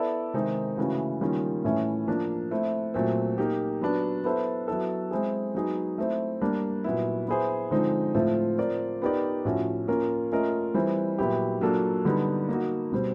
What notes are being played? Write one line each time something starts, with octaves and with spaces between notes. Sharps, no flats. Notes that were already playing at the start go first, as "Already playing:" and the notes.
Already playing: B3 E4 A4 D5
C3 D#3 G#3 C4 D#4
C#3 E3 A3 C#4 F#4
D#3 G3 A#3 C#4 F4
A2 E3 A3 C#4
F3 A#3 D4
A3 C4 E4
A#2 F#3 A3 C4
A#3 D#4 G4
F#3 B3 D4
B3 E4 A4 C5
F#3 B3 E4 A4
G#3 C4 E4 G#4
F#3 B3 D#4 G#4
A3 C4 E4
G3 A#3 D4
A#2 F#3 B3 E4
B3 E4 G#4 C5
D3 F3 G#3 C4 D#4
A2 F3 A3 C4 F4
C4 F4 A#4 D5
B3 D#4 G4 A#4 D5
A2 F3 A3 C#4 F#4
A#3 C#4 F4 A#4
A3 C#4 F4 A#4 D#5
E3 G3 C4
A#2 F#3 B3 E4 G4
F#3 A#3 D4 F4 A4
D3 G3 B3 D#4
A#3 D#4 F#4
B2 G3 C4